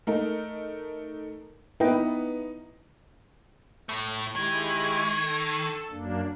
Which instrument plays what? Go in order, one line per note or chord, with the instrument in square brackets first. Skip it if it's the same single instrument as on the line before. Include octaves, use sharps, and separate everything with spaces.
[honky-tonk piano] A3 D#4 A#4
[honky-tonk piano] B3 [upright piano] D#4 [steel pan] E4 B4 G5
[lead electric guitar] A2 A3
[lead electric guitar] D#3 [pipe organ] G#3 E4 G4 [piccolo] G#6
[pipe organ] A4
F#2 A#3 D4